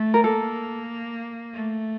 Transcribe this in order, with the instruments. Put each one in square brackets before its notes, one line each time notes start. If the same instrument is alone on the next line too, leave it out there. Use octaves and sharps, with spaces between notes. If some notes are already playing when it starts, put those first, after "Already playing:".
Already playing: [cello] A3
[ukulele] A#4
[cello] A#3 [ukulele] A4
[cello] A3